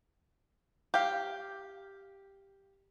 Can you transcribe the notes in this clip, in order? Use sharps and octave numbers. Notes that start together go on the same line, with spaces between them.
G4 F5